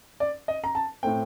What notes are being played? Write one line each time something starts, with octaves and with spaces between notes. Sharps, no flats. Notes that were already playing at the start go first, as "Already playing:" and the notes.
D5
D#5
A#5
A5
A2 A3 C4 G5